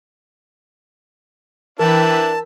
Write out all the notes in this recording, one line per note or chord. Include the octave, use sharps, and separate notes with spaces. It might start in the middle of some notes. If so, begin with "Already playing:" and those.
E3 D4 E4 A#4 B4 G5 A5 B6